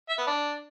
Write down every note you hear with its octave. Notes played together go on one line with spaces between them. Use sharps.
E5
B3
D4